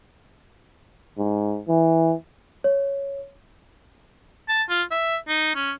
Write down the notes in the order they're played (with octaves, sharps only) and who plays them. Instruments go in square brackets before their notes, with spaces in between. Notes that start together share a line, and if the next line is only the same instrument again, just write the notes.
[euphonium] G#2
E3
[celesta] C#5
[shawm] A5
F4
E5
D#4
C#4